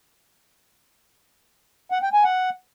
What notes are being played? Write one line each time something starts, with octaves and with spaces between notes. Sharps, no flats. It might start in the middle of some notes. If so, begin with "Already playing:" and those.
F#5
G5
G#5
F#5